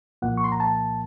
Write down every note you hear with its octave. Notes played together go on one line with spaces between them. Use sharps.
C2 A#2 F3 A#3 F#5
C#6
C6
A#5
A5